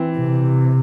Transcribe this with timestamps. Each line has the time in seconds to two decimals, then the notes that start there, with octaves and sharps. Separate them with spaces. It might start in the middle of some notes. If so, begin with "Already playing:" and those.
Already playing: E3 C4
0.17 C3